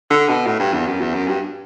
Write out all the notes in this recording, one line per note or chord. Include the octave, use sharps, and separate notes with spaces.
D3
B2
A2
G2
E2
F#2
E2
F#2
G2